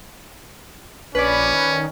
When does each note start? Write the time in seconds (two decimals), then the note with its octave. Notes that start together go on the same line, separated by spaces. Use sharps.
1.15 A#1 C#4 B4 D5
1.54 D#3